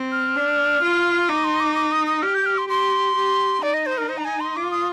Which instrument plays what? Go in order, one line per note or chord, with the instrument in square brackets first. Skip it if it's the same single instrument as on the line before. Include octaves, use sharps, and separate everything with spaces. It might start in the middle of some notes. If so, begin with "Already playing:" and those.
Already playing: [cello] C4
[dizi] F6
[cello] D4
F4
[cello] D#4 [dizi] D6
[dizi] C6
D6
D6
D#6
D#6
[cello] G4 [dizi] F6
[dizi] G6
F6
C6
[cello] G4 [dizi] C6
[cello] G4
[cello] D#4 [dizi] D5
[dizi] D#5
C5
A#4
C5
A#5
G#5
C6
[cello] F4 [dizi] D6
[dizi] D#6